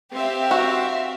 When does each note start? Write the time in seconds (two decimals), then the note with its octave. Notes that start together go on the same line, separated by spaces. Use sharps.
0.14 C4 G4 E5 F5
0.51 F#4